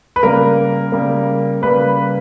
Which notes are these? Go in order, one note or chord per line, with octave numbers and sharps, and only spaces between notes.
B4
C#3 G3 A#3 A#4
C#3 G3 A#3
C#3 G3 A#3 B4